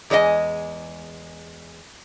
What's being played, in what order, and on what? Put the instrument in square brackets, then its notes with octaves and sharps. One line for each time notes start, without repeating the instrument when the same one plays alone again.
[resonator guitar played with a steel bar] E2 G#3 C4 D4 D#5 G#5